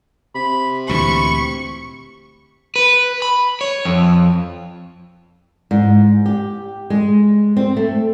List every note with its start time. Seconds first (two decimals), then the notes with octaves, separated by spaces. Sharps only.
0.35 C3 B5
0.89 D2 A#2 E3 B5 C#6
2.76 B4
3.22 B5
3.61 C#5
3.85 F2
5.71 G#2
6.26 G4
6.90 G#3
7.57 C4
7.77 A3